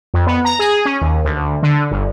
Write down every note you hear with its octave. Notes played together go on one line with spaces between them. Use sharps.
F2
B3
A#5
G#4
C#4
D#2
D2
D3
G1